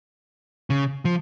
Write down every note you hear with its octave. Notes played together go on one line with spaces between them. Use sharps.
C#3
F3